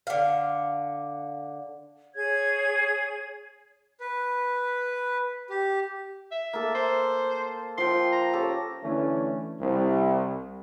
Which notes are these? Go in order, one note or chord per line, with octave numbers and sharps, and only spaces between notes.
D3 F5
G#4 C#5 G#6
B4
G4
E5
A#3 A4
C5
F3 G5 C6
A#5
C#4 G4 A4
D3 E3 A3 C#4
C2